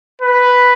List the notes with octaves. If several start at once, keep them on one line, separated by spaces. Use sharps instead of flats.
B4